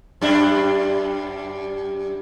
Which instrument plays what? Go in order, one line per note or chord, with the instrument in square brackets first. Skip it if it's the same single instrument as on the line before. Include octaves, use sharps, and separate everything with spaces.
[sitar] F#2 G3 D4